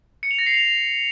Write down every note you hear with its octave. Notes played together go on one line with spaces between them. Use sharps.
C#7
F7
A#6
C7
F7